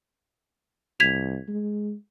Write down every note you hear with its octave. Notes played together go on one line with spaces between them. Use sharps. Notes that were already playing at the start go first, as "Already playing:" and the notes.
C2 G#6 B6 F7
G#3